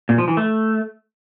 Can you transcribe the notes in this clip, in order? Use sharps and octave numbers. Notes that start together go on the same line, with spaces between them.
A#2
F3
E3
A3